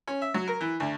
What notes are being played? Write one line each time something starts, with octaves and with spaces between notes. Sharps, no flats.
C#4
E5
F#3
A#4
E3
D2